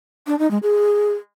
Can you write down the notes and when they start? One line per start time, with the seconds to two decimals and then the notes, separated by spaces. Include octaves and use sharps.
0.27 D4
0.39 D#4
0.51 G#3
0.63 G#4